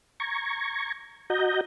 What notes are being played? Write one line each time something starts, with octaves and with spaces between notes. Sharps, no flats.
A#5 C#6 G#6
F#4 D#5 A#5 G6